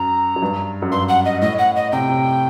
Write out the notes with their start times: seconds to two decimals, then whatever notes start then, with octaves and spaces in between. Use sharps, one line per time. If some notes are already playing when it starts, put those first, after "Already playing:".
Already playing: F#2 A#5
0.36 F#2
0.42 G2
0.82 F#2
0.91 G2 C6
1.08 F#5
1.25 D#5
1.41 A2 D#5
1.59 F#5
1.76 D#5
1.92 C3 G5
2.09 C3